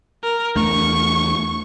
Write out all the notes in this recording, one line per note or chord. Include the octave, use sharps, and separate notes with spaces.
A#4
E2 A3 D4 C#6